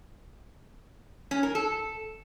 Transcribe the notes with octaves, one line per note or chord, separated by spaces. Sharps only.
C#4
A#4
A4